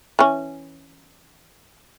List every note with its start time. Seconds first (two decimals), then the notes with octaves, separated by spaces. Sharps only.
0.19 E3 C#4